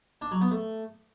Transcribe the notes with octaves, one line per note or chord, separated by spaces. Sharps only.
D4
F#3
B3
A3